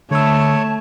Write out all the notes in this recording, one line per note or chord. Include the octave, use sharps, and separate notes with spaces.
D3 A3 C#5 A5 B5 E6